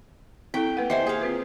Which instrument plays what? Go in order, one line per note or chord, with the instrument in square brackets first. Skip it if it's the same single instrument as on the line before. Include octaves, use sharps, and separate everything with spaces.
[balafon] C4 E4 A4 [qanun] G5
[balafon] A#3 B4 F#5
[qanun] G4 C5 G#5 [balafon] D#5 E5
[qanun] G#4 F5
[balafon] C4 F4 B4